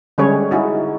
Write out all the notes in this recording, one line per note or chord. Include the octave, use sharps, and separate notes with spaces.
D3 G3 G#3 C#4 G#4 C#5
D#4 E4 F#4 G#4